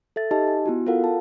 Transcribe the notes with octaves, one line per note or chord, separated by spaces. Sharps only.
A4 E5 A6
D#4 G4 D#5 A5
G#5
B3 E4 F#4
F4 A4 A#4 F5 F#5
A5